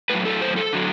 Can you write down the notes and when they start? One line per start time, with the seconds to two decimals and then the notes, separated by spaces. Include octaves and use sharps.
0.10 A2 F#3 B4
0.25 A4
0.41 C5
0.56 A4
0.73 D3 F#3